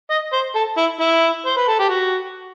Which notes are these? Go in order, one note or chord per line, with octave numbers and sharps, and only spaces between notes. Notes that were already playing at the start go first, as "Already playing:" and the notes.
D#5
C5
A4
E4
E4
C5
B4
A4
G4
F#4